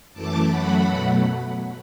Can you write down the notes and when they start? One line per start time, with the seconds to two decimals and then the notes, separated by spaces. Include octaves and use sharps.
0.13 F#2 E3 A3 A5 D6
0.50 F#2 F#3 A3 F#5 B5
0.86 B2 F#3 A3